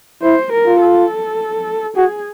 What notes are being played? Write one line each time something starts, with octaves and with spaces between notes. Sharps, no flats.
E4 C5
A#4
F4
A4
F#4 G#4